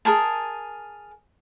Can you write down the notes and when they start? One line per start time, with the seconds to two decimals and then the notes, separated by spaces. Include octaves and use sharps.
0.05 G#4 A#4 G#5 A5